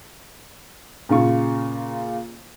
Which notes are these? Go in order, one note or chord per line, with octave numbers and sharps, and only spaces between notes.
A#2 C#3 F4 C#6